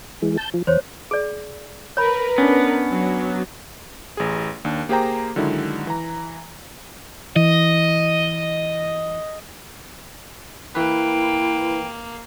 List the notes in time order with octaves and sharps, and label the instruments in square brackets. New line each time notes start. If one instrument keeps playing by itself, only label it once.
[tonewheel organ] E3 G#3
A5 G6
F3
[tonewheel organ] E2 [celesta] C5 C#5
[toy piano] G#4 D5
[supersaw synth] A#4 B4 [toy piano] C#5 B5
[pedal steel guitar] B3 [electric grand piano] C#4 D4
[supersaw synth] F#3
[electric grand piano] A1 G#4
D#2 D4
A#3 G4 G#4 C5 G5 A#5
D3 D#3 F#3 G#3 E4
E3 A#5
[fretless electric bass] E3 [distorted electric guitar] D#5
[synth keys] E3 B4 [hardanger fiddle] A#3 [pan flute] E4 [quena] G5